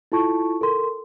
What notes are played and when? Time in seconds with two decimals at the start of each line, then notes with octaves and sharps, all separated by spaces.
0.12 E4 F4 A4 A5 C#6
0.61 A4 A#4 C6